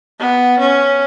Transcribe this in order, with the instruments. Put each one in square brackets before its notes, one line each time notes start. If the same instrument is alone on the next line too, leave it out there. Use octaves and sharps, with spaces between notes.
[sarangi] B3
C#4